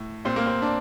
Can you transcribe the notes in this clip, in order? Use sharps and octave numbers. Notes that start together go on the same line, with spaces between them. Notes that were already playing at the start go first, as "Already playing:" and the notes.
Already playing: A2
A#2 C4
A#3
C4
D4